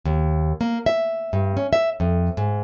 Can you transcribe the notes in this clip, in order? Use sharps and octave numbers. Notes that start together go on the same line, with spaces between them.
D#2
A#3
E5
G2
C#4
E5
F2
G#2